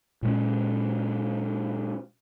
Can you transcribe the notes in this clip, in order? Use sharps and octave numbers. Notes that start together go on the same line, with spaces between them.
A#2 G#3 C#4